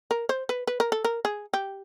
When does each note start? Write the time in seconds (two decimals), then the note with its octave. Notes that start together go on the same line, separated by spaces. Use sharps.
0.11 A#4
0.29 C5
0.49 B4
0.67 B4
0.80 A#4
0.92 A4
1.05 A#4
1.25 G#4
1.54 G4